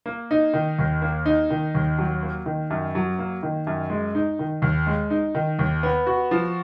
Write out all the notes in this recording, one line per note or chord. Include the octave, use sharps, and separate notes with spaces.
A#3
D#4
D#3
D#2
A#3
D#4
D#3
D#2
F#3
A#3
D#3
F#2
F#3
A#3
D#3
F#2
G#3
D#4
D#3
D#2
G#3
D#4
D#3
D#2
B3
F#4
F3